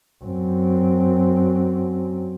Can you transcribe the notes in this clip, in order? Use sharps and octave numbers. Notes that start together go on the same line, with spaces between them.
F#2 C4